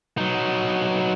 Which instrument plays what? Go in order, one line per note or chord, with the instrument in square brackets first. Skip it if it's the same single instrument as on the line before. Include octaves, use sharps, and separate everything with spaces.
[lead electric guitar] F#3 D#4